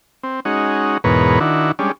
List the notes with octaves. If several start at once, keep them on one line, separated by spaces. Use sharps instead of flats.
C4
G#3 C#4 D#4 F#4
E2 G#2 B2 A#4 B4 C#5
D#3 D4 E4 F#4
G3 G#3 C#4 D4